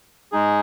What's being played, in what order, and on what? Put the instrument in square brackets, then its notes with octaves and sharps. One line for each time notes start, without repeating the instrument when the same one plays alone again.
[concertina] G#3 D#4 G#4